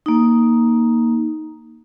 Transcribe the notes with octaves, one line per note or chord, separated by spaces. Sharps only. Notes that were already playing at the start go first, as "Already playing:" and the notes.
A#3 D#4